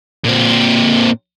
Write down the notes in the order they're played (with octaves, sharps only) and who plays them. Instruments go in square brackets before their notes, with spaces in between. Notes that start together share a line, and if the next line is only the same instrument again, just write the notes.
[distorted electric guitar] A#2 C4